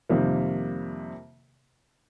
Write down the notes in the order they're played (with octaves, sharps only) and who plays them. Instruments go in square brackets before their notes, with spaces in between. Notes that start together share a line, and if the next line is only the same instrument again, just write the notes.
[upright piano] F2 C3 D#3 G3 A#3